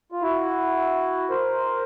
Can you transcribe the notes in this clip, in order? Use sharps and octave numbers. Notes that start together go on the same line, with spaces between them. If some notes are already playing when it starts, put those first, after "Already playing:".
F4
E4 F#4
A#4 C5